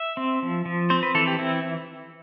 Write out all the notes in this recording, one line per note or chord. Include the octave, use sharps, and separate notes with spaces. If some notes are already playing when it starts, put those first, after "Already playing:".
Already playing: E5
C4
F3
F3
C4 C5
B4
E3 A4
G4
C4 E4